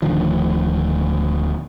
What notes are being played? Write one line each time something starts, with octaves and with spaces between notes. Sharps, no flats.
D1 D2 D#3 F3